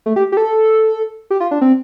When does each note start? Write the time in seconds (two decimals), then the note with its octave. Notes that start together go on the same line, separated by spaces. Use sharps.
0.06 A3
0.16 G4
0.32 G4
0.37 A4
1.30 G4
1.40 F4
1.51 D4
1.61 C4